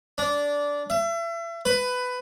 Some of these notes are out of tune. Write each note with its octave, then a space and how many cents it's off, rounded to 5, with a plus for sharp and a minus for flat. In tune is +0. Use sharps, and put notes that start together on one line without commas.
D4 -15
E5 +35
B4 +15